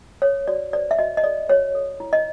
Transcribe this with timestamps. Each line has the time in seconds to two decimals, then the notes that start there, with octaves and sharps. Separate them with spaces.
0.22 A4 C#5
0.48 F#4 D5
0.73 C5 D5
0.91 E5
0.99 F#4 D#5
1.17 D#5
1.24 A4 D5
1.49 F#4 C#5
1.75 A4
2.00 E4
2.13 D#5